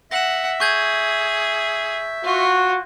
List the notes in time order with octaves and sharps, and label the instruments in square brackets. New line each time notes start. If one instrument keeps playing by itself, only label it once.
[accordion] E5 [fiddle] F#5 [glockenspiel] A#6 E7
[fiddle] G#4 [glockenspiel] C#6 G6 G#6
[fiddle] F4 [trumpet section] F#4